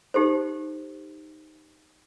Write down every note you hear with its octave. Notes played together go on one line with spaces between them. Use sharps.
D#4 G4 A4 C5